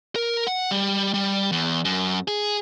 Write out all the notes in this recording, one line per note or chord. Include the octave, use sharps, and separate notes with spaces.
A#4
F#5
G3
G3
E2
F#2
G#4